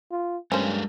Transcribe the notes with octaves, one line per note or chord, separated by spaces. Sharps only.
F4
G2 G#3 C#4 A4 A#4 C5